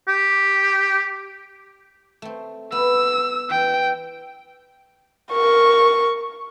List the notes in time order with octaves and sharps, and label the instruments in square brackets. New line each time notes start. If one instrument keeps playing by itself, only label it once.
[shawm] G4
[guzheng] A3 C4
[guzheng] B3 [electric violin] E6
[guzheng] E3 [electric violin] G5
[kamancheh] A#4 C#6